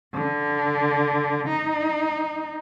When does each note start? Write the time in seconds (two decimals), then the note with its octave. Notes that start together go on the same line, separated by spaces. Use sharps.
0.14 D3
1.49 D#4